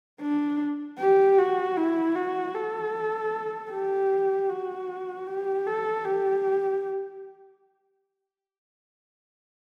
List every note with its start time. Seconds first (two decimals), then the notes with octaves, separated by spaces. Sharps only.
0.21 D4
0.99 G4
1.38 F#4
1.77 E4
2.15 F#4
2.54 A4
3.71 G4
4.50 F#4
5.27 G4
5.67 A4
6.05 G4